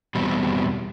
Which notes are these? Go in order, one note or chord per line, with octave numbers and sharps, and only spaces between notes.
E2 B2 G3 C4